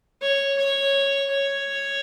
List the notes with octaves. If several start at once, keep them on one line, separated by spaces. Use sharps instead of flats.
C#5
C#5
C#5